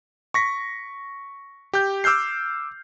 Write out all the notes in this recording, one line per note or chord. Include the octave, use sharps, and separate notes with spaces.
C#6 A#6 B6
G4 G6
D6 E6 F6 G6 C7